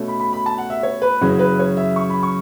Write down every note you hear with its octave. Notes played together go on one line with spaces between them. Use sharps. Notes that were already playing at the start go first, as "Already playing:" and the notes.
Already playing: B2 A3 C#4
B5
B5
B5
A5
F#5
E5
C#5
B4
F#2 C#3 E3 C#4 F#4
B4
C#5
E5
C#6
B5
C#6